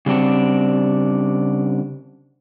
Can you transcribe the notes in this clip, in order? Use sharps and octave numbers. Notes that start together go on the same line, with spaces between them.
C#3 G3 C4 D4 F#4